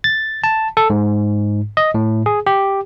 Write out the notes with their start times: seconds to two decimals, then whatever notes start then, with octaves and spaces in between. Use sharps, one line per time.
0.04 A6
0.44 A5
0.77 A4
0.90 G#2
1.77 D#5
1.94 A2
2.26 G#4
2.47 G4